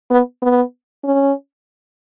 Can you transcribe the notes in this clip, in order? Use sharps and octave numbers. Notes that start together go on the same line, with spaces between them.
B3
B3
C#4